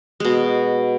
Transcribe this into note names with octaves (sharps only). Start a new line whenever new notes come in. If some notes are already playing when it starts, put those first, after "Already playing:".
B2 G#3